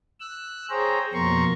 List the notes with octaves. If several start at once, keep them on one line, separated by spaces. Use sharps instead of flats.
E6 F#6
G#4 C5 C#5 G5 A#5
F2 B2 A#3 A#5 C6 C#6